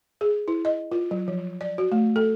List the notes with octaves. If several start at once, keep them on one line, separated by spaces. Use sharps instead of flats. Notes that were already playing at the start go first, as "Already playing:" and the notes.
G#4
E4
D#5
F4
F#3
F3
D5
F#4
A3
A4